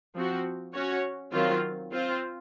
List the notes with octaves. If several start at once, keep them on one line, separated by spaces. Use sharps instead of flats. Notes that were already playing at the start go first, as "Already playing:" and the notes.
F3 C4 F#4
C#4 F#4 C#5
D#3 F#3 C4 F4
C4 F4 C5